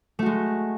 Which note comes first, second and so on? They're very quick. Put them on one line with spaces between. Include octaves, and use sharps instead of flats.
A3 F#4 G#3